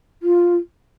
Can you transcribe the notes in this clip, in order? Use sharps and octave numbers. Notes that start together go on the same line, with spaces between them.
F4